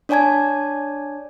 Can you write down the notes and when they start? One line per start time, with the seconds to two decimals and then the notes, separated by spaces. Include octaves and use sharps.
0.09 D4 C#5 D5 G#5 A5 G#6